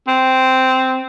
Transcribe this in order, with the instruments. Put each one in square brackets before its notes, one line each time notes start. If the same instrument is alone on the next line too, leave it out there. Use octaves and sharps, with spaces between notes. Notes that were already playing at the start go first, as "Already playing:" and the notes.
[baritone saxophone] C4